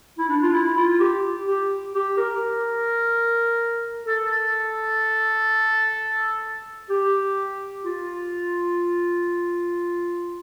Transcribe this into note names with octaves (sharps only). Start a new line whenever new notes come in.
E4
D4
F4
E4
F4
G4
G4
G4
A#4
A4
G4
F4